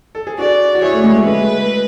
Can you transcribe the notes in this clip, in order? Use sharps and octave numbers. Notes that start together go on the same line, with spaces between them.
A4
G#4
D4 F#4 D5
F#4
E4 G#4 C#5
A3
G#3
A3
G#3 B4